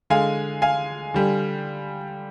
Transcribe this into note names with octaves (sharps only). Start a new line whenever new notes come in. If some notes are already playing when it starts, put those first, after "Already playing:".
D3 G#3 F5 G#5
F5 G#5
D3 G3